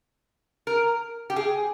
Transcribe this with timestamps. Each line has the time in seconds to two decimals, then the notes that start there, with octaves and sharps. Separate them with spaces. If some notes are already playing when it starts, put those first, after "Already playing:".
0.67 A#4
1.30 G4
1.36 G#4